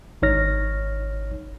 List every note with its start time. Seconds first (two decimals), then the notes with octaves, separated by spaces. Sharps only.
0.22 G#1 D#4 C#5 F6 A#6